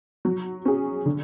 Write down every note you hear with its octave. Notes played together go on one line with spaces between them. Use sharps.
F#3
C#4 G#4
D3